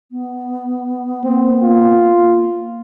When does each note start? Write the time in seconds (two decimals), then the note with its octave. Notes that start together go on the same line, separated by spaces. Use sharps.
0.11 B3
1.24 A#3 C4
1.63 F4